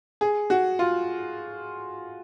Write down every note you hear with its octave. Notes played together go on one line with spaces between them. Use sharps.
G#4
F#4
F4